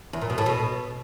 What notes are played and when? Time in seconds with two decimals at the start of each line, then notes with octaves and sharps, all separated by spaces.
0.13 E2
0.21 A#2
0.30 B2
0.38 A2
0.46 B2